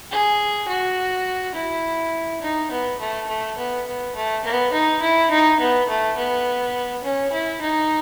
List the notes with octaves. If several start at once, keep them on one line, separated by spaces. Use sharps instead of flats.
G#4
F#4
E4
D#4
B3
A3
A3
B3
B3
A3
B3
D#4
E4
D#4
B3
A3
B3
C#4
E4
D#4